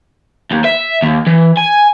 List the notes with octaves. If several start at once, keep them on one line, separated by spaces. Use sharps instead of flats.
D#2
E5
D#2
E3
G#5